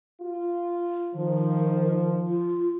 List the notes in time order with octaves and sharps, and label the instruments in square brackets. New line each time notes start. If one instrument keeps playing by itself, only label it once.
[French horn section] F4
[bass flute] D#3 [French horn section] F3
[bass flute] F4